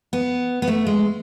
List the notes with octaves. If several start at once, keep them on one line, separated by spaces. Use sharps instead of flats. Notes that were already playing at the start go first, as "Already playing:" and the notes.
B3
B3
A3
G#3